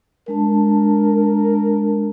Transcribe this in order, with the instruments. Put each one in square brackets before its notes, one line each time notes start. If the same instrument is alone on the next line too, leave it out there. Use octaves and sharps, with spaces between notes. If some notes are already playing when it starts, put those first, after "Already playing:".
[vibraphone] G#3 D4 A5 [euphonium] A#4